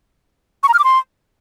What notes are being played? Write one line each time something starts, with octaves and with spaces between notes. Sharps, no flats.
C#6
A#5
F6
D6
C6